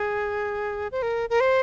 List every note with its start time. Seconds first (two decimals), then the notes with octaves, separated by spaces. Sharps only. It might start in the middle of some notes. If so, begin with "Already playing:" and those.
Already playing: G#4
0.92 C5
1.02 A#4
1.30 A#4
1.40 C5